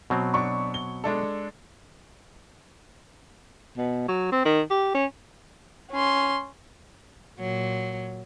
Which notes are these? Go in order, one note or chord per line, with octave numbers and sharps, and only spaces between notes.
B2 F#3 C4
D4 B5 C#6
G7
G#3 D4 A4
B2
F#3
C4
D#3
G4
C#4
C#4 C6
A#2 F#3